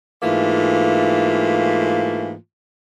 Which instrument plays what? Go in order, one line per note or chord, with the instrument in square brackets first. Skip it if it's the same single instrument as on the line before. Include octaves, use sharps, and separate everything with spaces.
[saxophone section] G#2 E3 A3 A#3 F4